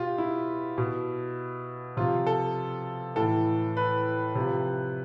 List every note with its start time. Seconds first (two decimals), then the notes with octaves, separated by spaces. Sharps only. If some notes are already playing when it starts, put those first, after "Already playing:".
Already playing: B2 F4 G4
0.18 E4
0.78 B2
1.97 C3 F3 F4
2.27 A4
3.16 A2 E3 A4
3.77 B4
4.35 C3
4.40 F3